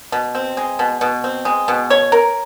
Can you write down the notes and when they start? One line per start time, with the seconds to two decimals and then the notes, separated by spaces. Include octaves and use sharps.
0.12 B2
0.35 C4
0.57 G#3
0.79 B2
1.01 B2
1.24 C4
1.45 G#3
1.68 B2
1.90 C#5
2.12 A#4